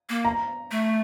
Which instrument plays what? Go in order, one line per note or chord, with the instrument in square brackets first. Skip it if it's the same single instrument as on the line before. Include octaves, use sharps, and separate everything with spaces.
[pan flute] A#3
[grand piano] A#5
[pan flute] A3